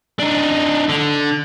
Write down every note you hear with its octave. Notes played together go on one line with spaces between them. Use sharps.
D4 D#4
D3